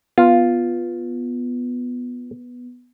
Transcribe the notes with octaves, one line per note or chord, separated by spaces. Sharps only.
B3 F4